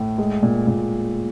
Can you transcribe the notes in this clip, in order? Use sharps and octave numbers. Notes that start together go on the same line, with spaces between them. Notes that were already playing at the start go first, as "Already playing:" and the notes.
Already playing: A2
G#3
A#2
A#2